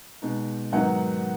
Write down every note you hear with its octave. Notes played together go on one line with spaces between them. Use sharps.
B2 G#3 D#4
G#2 D#3 F#3 B3 D#4 F#5